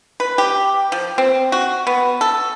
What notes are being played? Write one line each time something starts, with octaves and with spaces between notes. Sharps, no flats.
B4
G4
F3
C4
F#4
B3
A4